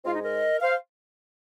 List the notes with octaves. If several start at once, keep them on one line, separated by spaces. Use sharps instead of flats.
G#2 G#3 C4 F4
D#4
A#4 D#5
C5 F5